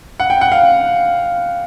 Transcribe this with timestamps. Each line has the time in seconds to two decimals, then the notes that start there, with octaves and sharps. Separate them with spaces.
0.20 F#5
0.30 G5
0.41 F#5
0.52 F5